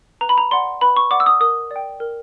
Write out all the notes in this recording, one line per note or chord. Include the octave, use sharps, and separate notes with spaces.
B4 A#5
B5
A#5
D5 F#5 C6
B4 B5
C#6
D5 F#5 D6
E6
D#6
A#4 D#6
D5 G5
A#4